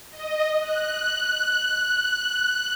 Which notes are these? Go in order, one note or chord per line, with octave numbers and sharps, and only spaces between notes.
D#5
F#6